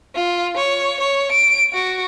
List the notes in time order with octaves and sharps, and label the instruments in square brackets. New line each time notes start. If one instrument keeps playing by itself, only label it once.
[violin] F4
C#5
C#5
D7
F#4